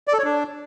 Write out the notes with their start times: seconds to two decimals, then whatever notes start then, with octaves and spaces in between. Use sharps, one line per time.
0.08 D5
0.13 A4
0.19 C#5
0.24 D4